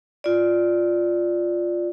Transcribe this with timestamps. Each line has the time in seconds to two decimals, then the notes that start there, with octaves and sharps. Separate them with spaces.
0.24 F4 D5